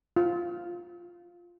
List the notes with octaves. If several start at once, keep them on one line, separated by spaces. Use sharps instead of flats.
F4